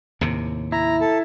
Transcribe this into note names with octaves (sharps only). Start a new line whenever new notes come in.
D#2 A2 C3
E4 A#5
A4